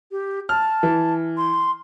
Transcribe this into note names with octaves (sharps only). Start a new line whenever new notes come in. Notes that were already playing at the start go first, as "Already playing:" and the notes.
G4
A5 F6
E3
C6